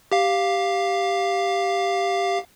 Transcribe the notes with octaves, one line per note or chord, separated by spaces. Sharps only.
G4 F5